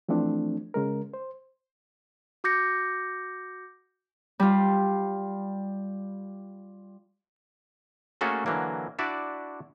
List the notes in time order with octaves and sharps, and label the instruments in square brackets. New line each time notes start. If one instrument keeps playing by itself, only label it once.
[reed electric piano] E3 F3 A3 C4 D4
C#3 G#3 A#4
C5
[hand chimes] F#4 D6 G6 A#6 C#7
[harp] G3 F4
[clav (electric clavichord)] A3 A#3 C#4 F#4 G#4 A4
D3 E3 F#3 A#3
D4 E4 F#4 D5 E5